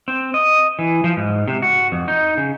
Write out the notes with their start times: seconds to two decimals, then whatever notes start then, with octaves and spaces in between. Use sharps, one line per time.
0.08 C4
0.34 D#5
0.79 E3
1.04 F3
1.17 G#2
1.48 C3
1.62 F#4
1.92 F2
2.08 D#4
2.37 C#3